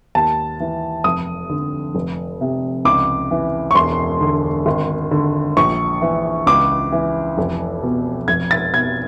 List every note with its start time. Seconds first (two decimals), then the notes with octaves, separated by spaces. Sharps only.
0.15 D#2 A5
0.60 E3
1.04 F1 D#6
1.49 D3
1.95 F1
2.41 C3
2.85 C#2 D6
3.31 E3
3.71 C#6
3.75 E1 C6
4.21 D3
4.66 G#1
5.11 D3
5.57 A#1 C#6
6.02 E3
6.47 C#2 D6
6.92 E3
7.38 F1
7.83 B2
8.28 F1 G#6
8.51 A6
8.73 B2 G#6